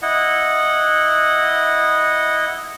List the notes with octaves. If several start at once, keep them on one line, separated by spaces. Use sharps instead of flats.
E4 D#5 F#5